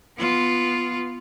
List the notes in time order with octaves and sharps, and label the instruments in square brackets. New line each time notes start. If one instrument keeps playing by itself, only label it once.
[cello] B3 F4